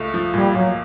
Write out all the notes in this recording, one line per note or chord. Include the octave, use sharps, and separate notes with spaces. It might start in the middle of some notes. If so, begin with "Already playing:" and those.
Already playing: C#2 A3
F3
A#2 G3
A#2 F#3